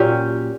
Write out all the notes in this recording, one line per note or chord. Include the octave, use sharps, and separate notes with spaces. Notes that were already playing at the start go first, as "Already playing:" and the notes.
Already playing: A#2 F#3 C#4 G4